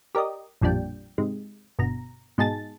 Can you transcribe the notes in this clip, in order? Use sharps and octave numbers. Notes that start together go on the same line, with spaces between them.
G4 A#4 D5 D#5
A1 F2 A#2 G3 D4 G5
G#2 C3 G#3
G1 B2 A#5
G#2 B2 D#4 G#4 A5 A6